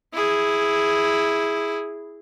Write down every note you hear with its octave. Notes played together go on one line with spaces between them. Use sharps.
E4 G#4